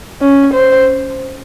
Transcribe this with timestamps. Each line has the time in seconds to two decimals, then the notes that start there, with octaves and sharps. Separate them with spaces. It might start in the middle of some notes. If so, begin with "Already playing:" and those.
0.21 C#4
0.54 C5